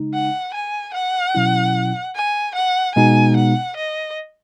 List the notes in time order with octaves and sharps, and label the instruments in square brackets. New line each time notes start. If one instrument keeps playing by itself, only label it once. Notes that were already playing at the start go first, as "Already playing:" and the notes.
Already playing: [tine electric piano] C#3 G#3 D#4
[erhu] F#5
G#5
F#5
[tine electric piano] B2 F#3 C#4 E4
[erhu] G#5
F#5
[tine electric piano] B2 G#3 B3 D#4 [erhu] G#5
[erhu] F#5
D#5